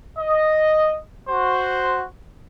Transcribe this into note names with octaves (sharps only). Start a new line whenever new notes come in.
D#5
F#4 C5